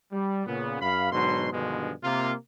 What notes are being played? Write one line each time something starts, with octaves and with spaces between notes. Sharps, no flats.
G3
A#2 C#3 B3
F#2 F5 B5
G#2 B2 D3 F#3 C6
G2 B2 D3 D#3 F3 G#3
C3 A#3 F4